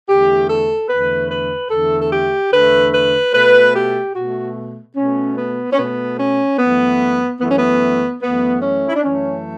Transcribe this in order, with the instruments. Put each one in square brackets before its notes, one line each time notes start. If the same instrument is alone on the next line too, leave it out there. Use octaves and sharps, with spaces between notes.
[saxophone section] E2 D3 A3 G4
A4
E2 D3 A3 B4
B4
E2 D3 A3 A4
A4
G4
E2 D3 A3 B4
B4
B2 A3 B4
G4
B2 A3 F#4
B2 A3 C#4
B3
C#4
B2 A3 B3
C#4
F#2 E3 A3 B3
F#2 E3 A3 B3
C#4
B3
F#2 E3 A3 B3
C#4
E4
D4
F#2 E3 A3 C#4